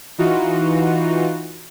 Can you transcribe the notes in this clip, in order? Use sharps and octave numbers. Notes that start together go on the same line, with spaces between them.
E3 D#4 F4 F#4